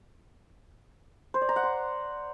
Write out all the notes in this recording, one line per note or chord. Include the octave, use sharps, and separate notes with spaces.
C5
D5
A#5
F#5
C6